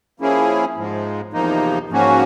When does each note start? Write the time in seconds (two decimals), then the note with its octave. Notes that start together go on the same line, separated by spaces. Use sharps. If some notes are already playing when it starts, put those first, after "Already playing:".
0.20 F3 A#3 C#4 E4 G#4
0.76 G#2 F3 G#3
1.33 E2 C3 F3 A#3 D#4
1.89 G#2 F3 A#3 C#4 F#4